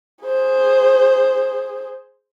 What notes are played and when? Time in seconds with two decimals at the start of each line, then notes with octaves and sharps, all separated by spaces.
0.25 G#4 C5